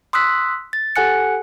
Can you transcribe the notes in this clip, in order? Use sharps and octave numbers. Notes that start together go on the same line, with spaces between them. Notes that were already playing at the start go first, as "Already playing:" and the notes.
C6 D#6 E6 F#6 B6
A6
G4 A4 F#5 G#5 F#6 C#7